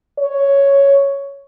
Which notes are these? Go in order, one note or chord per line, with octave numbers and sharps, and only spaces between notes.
C#5